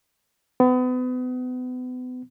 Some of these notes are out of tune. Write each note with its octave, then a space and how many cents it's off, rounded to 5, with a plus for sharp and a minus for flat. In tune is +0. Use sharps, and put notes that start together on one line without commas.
B3 +35